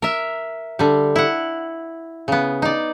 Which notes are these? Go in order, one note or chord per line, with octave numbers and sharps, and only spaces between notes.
A#4 E5
D3 G3
E4 F#5
C#3 B3
D#4 D5